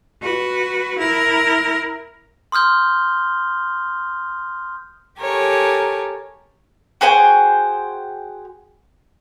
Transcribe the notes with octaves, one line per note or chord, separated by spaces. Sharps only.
F#4 B4
E4 A#4
C6 D#6 F6 G6 G7
G4 A4 A#4 C#5 G#5
F#4 G#4 C5 G5